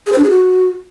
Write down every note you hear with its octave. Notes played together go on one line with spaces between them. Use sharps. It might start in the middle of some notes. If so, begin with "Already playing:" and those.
G#4
C5
D4
G#4
F#4